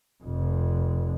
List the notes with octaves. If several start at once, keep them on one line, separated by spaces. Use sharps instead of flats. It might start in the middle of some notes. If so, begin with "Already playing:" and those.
F1 F2